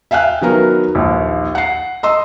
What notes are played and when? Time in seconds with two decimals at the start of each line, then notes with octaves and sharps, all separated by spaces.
0.11 E5 F5 G5 G#5 F#6
0.41 D#3 F#3 B3 A#4
0.95 A#1 D#2
1.55 F#5 C7
2.03 D#5 C6 E6